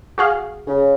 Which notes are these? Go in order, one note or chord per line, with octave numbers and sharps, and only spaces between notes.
F#4 G#4 F5
C#3